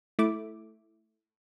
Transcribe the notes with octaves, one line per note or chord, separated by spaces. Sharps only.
A3 E4 D6